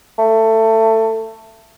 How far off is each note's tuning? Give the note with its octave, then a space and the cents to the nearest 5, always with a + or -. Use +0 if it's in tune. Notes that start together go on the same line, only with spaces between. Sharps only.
A3 +20